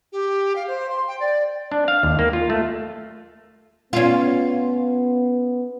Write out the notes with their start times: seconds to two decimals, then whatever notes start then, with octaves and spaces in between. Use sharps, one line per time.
0.12 G4
0.55 F5
0.67 C5
0.89 C6
1.07 G5
1.20 D5
1.72 D4
1.88 F5
2.03 D#2
2.19 A#3
2.33 F4
2.50 A3
3.93 B3 C#4 F4